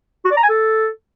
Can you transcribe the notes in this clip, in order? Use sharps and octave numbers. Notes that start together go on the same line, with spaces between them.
F#4
D5
A#5
G#5
A4